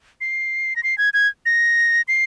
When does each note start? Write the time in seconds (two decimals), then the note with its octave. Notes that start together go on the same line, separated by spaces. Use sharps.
0.21 C7
0.76 A#6
0.83 C7
0.98 G#6
1.14 G#6
1.46 A#6
2.08 C7